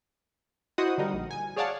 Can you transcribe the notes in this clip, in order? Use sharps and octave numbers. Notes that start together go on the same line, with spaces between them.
E4 F#4 C5 D#5 F#5 D#6
D3 G3 D#4 A#4
A#1
G#5
G#4 C#5 D5 F5 F#5 A5